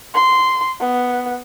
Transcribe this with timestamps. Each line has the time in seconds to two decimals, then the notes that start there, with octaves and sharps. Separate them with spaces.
0.14 C6
0.80 B3